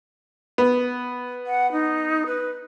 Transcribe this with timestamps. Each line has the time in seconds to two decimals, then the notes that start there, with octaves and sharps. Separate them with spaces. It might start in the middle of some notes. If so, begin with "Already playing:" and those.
0.58 B3
1.47 F#5
1.72 D#4
2.27 B4